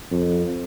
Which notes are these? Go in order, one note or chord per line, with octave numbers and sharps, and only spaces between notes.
F2